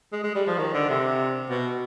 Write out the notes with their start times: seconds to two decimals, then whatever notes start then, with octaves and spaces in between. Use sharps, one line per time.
0.13 G#3
0.24 G#3
0.35 G3
0.47 F3
0.58 D#3
0.74 D3
0.89 C3
1.50 B2